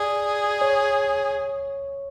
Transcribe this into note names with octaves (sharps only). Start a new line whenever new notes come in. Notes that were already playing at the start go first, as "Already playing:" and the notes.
Already playing: G#4 D5
C#5